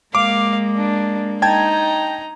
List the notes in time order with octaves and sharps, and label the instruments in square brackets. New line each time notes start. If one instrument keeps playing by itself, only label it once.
[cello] G#3 A#3 [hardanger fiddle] F5 [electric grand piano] D6
[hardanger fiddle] D4
[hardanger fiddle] D#4 A#5 [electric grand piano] G5 A5 G#6